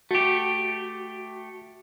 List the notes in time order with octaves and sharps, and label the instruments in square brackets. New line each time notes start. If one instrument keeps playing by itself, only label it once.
[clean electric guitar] A3 G4 [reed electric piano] F#4